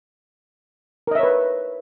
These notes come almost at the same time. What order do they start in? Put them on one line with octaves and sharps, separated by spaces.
A#4 D#5 E5 C#5 B4